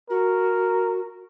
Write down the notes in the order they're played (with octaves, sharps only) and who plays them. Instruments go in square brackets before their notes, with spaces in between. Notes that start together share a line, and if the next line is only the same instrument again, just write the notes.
[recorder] F#4 [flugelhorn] A#4